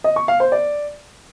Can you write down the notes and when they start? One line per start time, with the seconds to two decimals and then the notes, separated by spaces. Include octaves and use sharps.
0.04 D#5
0.16 C#6
0.28 F5
0.40 C5
0.52 D5